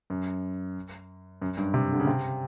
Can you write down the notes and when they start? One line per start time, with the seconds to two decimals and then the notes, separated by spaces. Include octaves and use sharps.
0.10 F#2
1.42 F#2
1.57 G2
1.74 C3
1.92 D3
2.00 C#3
2.07 C3